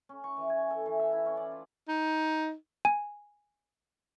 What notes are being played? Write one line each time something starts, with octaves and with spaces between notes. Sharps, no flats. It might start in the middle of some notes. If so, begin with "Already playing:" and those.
C#4
C#6
E3
G#5
A4
E3
E5
E4
C#4
D5
F4
D#4
G#5